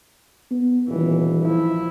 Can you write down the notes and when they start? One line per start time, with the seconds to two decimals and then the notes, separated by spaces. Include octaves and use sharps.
0.51 B3
0.88 D#1 E3
1.43 F3 E4